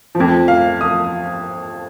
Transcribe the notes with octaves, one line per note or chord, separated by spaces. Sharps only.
F3
F2
F5
D#6